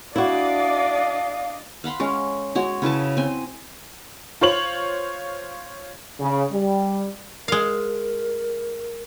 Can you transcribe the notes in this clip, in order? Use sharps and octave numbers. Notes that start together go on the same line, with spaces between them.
D4 E4 F#4 D5 D#5 F5
F5 F#5 B5 C6
G#3 C#4 F5
G#3 F#4 C#5
C#3 E4 B4 A5
C4 G#5
F4 C5 C#5 F#7
C#3
G3
G#3 A#4 F5